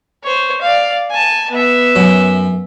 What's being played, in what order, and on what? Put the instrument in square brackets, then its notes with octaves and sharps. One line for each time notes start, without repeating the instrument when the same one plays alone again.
[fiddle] C5 C#5
D5 F5
G#5 A5
B3 E5
[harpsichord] F#2